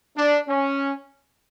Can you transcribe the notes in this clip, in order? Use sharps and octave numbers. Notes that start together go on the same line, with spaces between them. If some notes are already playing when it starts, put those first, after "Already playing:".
D4
C#4